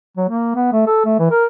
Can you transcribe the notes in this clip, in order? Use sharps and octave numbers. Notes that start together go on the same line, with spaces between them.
F#3
A#3
B3
A3
A4
A3
E3
A#4